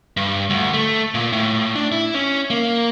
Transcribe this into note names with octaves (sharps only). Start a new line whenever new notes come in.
G2
D2
A3
A#2
A2
D4
E4
C#4
A#3